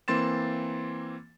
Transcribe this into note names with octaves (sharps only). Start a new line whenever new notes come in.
E3 A#3 C4 C6 A6 E7